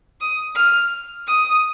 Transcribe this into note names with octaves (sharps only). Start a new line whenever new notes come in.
D#6
F6
D#6